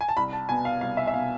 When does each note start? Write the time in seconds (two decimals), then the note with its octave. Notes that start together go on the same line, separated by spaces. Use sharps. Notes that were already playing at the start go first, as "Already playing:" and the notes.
0.01 G#5
0.09 A5
0.17 C2 B5
0.33 A5
0.49 B2 B3 G#5
0.65 F5
0.81 C2 F5
0.97 E5
1.07 E5
1.14 B2 B3 F5